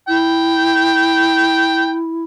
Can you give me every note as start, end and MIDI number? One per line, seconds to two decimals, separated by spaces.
0.08 2.24 64
0.08 1.95 79